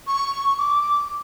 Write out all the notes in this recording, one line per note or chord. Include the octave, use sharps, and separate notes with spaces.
C#6
D6